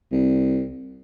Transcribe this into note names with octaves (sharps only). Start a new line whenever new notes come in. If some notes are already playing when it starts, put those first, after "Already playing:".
C2